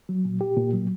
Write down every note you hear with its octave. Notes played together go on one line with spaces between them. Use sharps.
F#3
A#2
G4
A#2
F#3